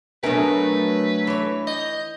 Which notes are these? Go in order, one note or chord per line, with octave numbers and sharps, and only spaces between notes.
B2 F#3 A3 D4 A#4 B4 G#5
E3 C#5
D#5 G6